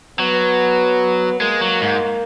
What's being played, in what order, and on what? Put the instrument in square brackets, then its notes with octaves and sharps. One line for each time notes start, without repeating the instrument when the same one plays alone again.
[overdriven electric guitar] F#3 [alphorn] B3
[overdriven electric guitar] G#3 [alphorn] A#3
[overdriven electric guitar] F#3
G#2